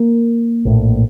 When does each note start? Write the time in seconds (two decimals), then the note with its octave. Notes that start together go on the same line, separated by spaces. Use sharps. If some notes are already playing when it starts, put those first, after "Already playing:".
Already playing: A#3
0.65 A#1 A2